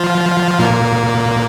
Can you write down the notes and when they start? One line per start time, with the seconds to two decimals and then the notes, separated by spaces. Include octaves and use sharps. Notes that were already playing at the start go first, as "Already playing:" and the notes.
Already playing: F3 F4
0.59 A#2 A#3